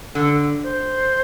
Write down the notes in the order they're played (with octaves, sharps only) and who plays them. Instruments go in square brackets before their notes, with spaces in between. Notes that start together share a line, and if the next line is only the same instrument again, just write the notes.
[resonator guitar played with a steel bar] D3 [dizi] A4
[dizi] C5